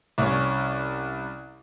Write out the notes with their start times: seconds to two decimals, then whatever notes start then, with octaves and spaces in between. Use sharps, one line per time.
0.18 C2 C#4